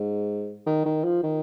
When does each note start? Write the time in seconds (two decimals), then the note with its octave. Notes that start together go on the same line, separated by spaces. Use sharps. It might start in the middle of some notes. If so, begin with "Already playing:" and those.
Already playing: G#2
0.66 D#3
0.85 D#3
1.04 F3
1.23 D#3